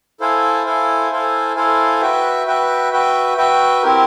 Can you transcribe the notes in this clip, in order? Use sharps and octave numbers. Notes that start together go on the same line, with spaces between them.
E4 A4 C5 F5 G#5
E4 A4 C5 F5 G#5
E4 A4 C5 F5 G#5
E4 A4 C5 F5 G#5
F#4 B4 E5 G5
F#4 B4 E5 G5
F#4 B4 E5 G5
F#4 B4 E5 G5
C4 E4 G4 A#4